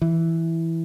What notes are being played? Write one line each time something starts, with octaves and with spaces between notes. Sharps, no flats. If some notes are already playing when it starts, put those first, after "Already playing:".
E3